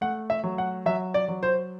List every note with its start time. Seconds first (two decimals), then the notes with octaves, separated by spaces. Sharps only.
0.01 A3 F#5
0.30 E5
0.44 F#3
0.58 F#5
0.86 F#3 E5
1.14 D5
1.28 F#3
1.43 C5